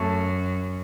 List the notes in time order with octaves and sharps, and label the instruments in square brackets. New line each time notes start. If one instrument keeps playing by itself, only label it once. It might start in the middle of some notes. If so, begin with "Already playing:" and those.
Already playing: [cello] F#2 [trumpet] A3